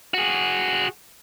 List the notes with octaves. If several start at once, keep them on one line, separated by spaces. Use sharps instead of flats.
F#4 G#4